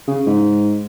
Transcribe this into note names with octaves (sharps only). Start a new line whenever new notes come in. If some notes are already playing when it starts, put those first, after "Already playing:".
C#3
G#2